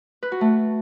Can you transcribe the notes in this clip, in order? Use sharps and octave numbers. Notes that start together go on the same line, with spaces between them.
B4
F#4
A3